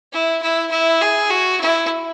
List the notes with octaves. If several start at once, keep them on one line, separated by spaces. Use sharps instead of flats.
E4
E4
E4
G#4
F#4
E4